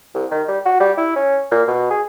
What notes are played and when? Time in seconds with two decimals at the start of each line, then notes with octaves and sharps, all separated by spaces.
0.15 C2
0.31 D#3
0.48 G3
0.65 F#4
0.80 G3
0.97 E4
1.16 C#4
1.52 A#2
1.68 B2
1.91 G#4